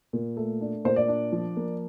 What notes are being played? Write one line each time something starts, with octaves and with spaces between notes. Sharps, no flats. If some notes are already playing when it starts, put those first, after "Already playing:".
A#2
A3
D4
A#2 C5
D5
D4
F3
A#3